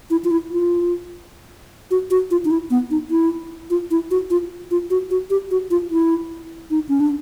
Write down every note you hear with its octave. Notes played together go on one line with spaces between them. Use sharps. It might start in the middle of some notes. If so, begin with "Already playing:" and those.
E4
F4
E4
F4
F#4
F#4
F4
D#4
E4
B3
D#4
E4
F4
E4
F#4
F4
F4
F#4
F#4
G4
F#4
F4
E4
D#4
C#4
D4